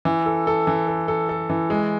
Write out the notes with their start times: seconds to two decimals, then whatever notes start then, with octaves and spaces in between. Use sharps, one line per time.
0.05 E3
0.26 A4
0.47 A4
0.67 E3
0.88 A4
1.08 A4
1.29 A4
1.50 E3
1.70 G#3